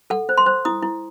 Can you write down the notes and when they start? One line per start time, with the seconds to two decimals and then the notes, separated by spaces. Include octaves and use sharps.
0.10 A4 F#5
0.29 C5
0.37 C6
0.46 C5
0.65 E4 D#6
0.82 E4